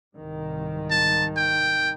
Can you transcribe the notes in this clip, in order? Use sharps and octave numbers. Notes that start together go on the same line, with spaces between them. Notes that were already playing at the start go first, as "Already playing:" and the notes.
C2 G#2 D#3
A5
G5